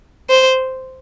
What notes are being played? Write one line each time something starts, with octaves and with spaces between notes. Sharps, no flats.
C5